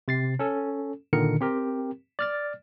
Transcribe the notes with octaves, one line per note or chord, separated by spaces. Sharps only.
C3 A6 C7
C#4 A4
A#2 D3 D#3 A#4 C#7
C4 G4 A#4
D5 F6 A6